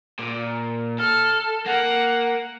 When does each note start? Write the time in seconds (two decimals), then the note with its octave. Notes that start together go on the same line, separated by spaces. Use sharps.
0.19 A#2
0.99 A4 F6
1.66 A#3 F#5